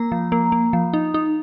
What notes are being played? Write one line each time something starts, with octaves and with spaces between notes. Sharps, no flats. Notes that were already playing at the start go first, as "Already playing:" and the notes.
Already playing: A#3 A#5
F3
A#3
A#3
F3
D#4
D#4